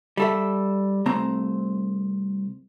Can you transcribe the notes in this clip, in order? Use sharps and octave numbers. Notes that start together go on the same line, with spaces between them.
G3 A4 E5
C2 A3 C4 A#5